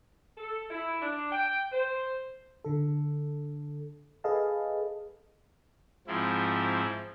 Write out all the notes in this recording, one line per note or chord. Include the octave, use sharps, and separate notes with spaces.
A4
E4
D4
G5
C5
D3 A4
G#4 A4 B4 D#5 F5 A5
G#2 F3 C4 E4